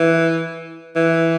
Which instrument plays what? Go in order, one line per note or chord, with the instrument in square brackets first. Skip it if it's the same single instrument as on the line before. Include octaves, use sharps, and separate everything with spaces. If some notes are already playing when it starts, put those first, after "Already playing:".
Already playing: [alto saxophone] E3
E3